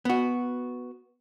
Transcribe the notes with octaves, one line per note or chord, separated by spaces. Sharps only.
B3 F#4